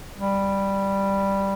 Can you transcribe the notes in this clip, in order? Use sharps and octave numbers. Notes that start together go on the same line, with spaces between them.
G3